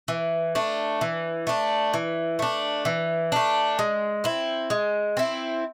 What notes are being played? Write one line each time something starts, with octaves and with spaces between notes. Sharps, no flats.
E3
A3 D4
E3
A3 D4
E3
A3 D4
E3
A3 D4
G#3
C4 E4
G#3
C4 E4